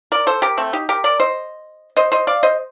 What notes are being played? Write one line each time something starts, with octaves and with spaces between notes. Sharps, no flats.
A#4 D5
A4 C5
G4 A#4
A3 C4
D#4 G4
G4 A#4
A#4 D5
C5 D#5
C5 D#5
C5 D#5
D5 F5
C5 D#5